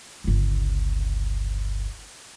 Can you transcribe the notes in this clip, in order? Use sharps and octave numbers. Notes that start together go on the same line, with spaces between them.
G1 C#2